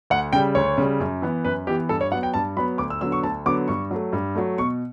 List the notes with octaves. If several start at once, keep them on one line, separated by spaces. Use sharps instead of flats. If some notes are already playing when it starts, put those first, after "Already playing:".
D2 F#5
C#3 G3 G5
D2 C#5
C#3 G3
F#2
E3 B3
F#2 B4
E3 B3 G4
G2 A4
C#5
F#3 B3 F#5
G5
G2 A5
F#3 B3 B5
D2 D6
E6
D3 F#3 B3 E6
C#6
D2 A5
D3 F#3 B3 D6
G2 C#6
F#3 A3
G2
F#3 A3
B2 C#6